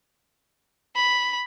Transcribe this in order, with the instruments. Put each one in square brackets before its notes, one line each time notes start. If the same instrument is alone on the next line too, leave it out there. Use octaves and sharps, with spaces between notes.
[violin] B5